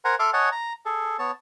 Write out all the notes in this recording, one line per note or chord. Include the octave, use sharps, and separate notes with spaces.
A#4 C5 F#5 G#5 A#5
A4 E5 C6 D6 F6
C#5 D#5 F#5 G#5 A5
A#5
G#4 A4
B3 C#5 A5